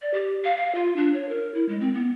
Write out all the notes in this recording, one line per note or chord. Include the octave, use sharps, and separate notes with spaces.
D5
G4
F5
F5
F4
D4
C#5
A#4
E4
G#3
C4
B3